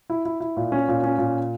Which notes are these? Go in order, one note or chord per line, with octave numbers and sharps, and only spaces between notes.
E4
E4
E4
A#2
C#4
A#2
C#4
A#2